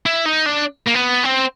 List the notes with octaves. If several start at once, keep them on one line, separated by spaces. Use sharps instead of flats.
E4
D#4
D4
A#3
B3
C4